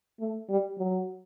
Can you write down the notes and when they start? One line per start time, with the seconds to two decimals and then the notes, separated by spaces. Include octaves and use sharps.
0.20 A3
0.49 G3
0.78 F#3